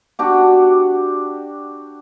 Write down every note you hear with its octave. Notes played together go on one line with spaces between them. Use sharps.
D4 F#4 G4